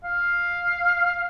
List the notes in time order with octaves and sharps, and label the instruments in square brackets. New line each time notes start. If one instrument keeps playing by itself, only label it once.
[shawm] F5